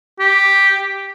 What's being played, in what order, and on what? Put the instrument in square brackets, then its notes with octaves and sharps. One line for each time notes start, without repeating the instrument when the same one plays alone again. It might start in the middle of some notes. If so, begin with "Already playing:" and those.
[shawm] G4